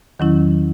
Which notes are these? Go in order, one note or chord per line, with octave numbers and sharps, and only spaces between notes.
E2 D#3 F#3 C#4 E4